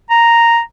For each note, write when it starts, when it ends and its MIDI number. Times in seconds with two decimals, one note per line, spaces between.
0.10 0.59 82